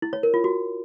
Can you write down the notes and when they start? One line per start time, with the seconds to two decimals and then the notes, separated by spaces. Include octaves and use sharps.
0.02 E4
0.13 C#5
0.23 A#4
0.34 F4
0.44 F#4